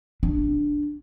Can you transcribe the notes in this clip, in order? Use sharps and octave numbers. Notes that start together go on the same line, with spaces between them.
D4